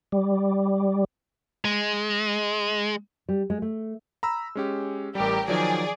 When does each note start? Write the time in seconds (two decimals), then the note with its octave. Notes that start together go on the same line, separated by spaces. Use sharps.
0.12 G3
1.65 G#3
3.29 G3
3.50 G#3
3.62 A3
4.23 A#5 B5 E6
4.55 G#3 C#4 G4
5.15 A1 G3 G4 A#4
5.48 D#3 F3 F#3 G#4 D5